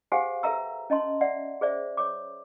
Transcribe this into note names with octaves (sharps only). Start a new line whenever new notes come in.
G4 G#4 C5 F5 F#5 G#5
A4 B4 E5 A#5 E6
C#4 D#5 A5 C6
D5 E5 F#5
G#4 C5 D5 E5
C#5 D6